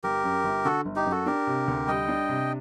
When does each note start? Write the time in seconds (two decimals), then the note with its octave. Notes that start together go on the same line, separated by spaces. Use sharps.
0.03 G1 G4 A#4
0.24 F#2
0.44 G1
0.65 D3 F#4 A4
0.85 G1
0.96 D#4 G4
1.06 F#2
1.11 F#4 A4
1.26 D4 G4 A#4
1.47 C3
1.68 D2
1.88 G3 D#5 G5
2.08 D4
2.29 C3